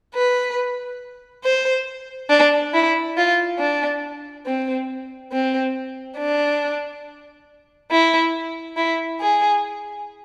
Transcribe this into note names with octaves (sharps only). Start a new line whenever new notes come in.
B4
C5
D4
E4
F4
D4
C4
C4
D4
E4
E4
G#4